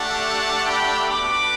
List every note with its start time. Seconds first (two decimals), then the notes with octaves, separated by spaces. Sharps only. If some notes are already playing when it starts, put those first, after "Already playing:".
Already playing: A3 D4 G4 F#5 A5
0.66 G5 B5
1.09 B3 D4 F#4 B5 D6